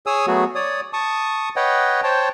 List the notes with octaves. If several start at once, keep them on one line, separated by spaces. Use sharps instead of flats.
G#4 C#5 G#5 D#6 E6
F#3 A3 B3 F#4 G#4
C#5 D5 D#6
A5 C#6 D#6
B4 C#5 D#5 F#5 G5
C5 C#5 G5 A5